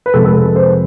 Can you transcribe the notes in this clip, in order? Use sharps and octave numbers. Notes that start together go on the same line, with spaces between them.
B4
F2 C3 G#3 A4
A4
B4
C5